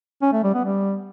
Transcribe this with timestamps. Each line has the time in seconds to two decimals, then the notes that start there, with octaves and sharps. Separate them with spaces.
0.22 C#4
0.33 A3
0.43 G3
0.54 B3
0.65 G3